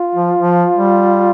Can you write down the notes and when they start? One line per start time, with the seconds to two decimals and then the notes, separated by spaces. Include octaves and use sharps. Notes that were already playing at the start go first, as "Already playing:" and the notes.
Already playing: F4
0.15 F3
0.39 F3
0.76 G3